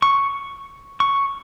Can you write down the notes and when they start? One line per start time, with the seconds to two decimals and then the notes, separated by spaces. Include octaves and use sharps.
0.02 C#6
1.00 C#6